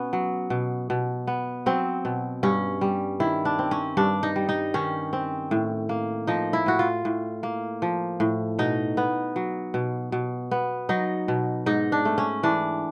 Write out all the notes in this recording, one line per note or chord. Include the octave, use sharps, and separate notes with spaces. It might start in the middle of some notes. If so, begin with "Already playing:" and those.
Already playing: B2 B3 C#4
F#3
B2
B2
B3
F#3 C4
B2
G2 C#4
G3
D#3 E4
D4
C4
C#4
G2 D4
D#4
G3
D#4
D#3 C#4
C4
A2
A#3
F3 D#4
E4
A2 F#4
F4
A2
A#3
F3
A2
B2 D#4
B3
F#3
B2
B2
B3
F#3 D#4
B2
G#2 D#4
D4
A3
C#4
E3 D4